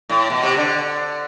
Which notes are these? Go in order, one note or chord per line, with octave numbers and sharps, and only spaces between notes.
A2
B2
C3
D3